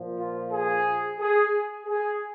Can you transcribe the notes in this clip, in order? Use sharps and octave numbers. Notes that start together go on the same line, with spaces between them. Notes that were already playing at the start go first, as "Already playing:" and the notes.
Already playing: A#2 F3
F4
G#4
G#4
G#4